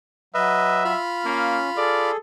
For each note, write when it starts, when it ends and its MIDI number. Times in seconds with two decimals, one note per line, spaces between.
0.35 0.93 54
0.35 0.83 71
0.35 0.83 75
0.35 1.00 76
0.85 2.11 65
0.85 2.11 83
0.85 2.11 89
1.25 1.60 58
1.25 1.70 61
1.77 2.17 68
1.77 2.17 69
1.77 2.12 74